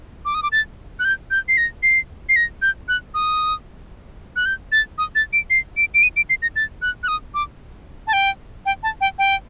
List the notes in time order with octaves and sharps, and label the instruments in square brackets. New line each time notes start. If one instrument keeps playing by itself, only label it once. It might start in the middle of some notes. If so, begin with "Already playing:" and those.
[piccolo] D6
D#6
D6
A6
F#6
G6
G6
C7
A#6
C7
C7
A#6
G6
F#6
D#6
F#6
G6
A6
D#6
A6
D7
C7
D7
D7
D#7
D7
C7
A#6
A6
F#6
F#6
D#6
D6
A5
G5
G5
A5
G5
G5